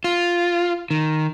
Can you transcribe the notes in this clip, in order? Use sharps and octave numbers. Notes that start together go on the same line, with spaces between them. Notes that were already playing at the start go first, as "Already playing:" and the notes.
F4
D#3